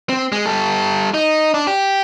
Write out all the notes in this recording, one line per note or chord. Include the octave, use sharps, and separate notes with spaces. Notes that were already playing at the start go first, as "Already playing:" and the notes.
C4
G#3
G3 A4
D#4
D4
G4